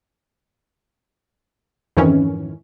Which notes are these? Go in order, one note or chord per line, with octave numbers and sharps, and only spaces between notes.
F2 G#2 D#3 E3 C#4